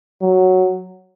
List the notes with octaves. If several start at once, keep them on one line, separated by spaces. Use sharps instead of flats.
F#3